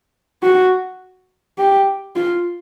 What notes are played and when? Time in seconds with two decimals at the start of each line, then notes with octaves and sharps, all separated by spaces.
0.43 F#4
1.58 G4
2.16 F4